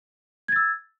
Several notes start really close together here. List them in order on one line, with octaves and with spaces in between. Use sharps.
G#6 A6 E6